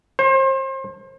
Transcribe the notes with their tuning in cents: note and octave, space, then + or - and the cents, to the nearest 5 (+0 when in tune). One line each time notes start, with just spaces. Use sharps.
C5 +35